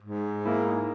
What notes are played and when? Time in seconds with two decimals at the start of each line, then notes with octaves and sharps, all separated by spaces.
0.02 G#2
0.45 A#3 E4